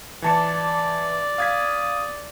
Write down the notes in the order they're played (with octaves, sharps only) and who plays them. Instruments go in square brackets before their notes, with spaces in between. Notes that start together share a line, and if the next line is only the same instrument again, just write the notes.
[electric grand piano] E3 A5 C#7 [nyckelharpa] D5
[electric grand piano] F5 G#6 B6 [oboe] D#6